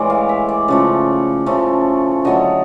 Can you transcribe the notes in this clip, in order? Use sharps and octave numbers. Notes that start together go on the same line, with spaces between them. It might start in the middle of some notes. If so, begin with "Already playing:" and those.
Already playing: A2 E3 G#3 D5
F5
E5
D5
C#3 F3 A3 D5
C#3 F3 A3
D3 F#3 A3 D#5